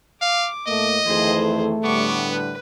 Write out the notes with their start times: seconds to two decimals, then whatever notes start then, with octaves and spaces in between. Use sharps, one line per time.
0.22 F5 D6
0.67 A2 A3 A#3 D#5
1.06 F2 D#3 E3 A3 G#4 C5
1.84 A2 D3 G3 B3 C#6 D6
2.28 B4